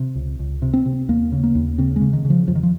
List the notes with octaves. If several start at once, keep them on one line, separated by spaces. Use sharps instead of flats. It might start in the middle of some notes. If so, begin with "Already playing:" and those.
Already playing: C3
C#2
C#2
C3
C4
C3
D#2 A#3
C#3
A#3
D#2
C#3 C4
G#3
C#3
D#3
C#3
F3
F2 F3
D#3
F3